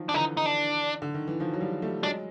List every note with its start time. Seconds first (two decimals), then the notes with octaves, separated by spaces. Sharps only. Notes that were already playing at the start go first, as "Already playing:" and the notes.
Already playing: D#3 F3 F#3
0.09 D4
0.14 D3 E3 D#4
0.37 D#4
0.46 D4
1.02 D3
1.14 D#3
1.27 E3
1.40 D#3 F3
1.54 F#3
1.61 F3 G3
1.82 G3 A3
2.03 F#3 G#3 D4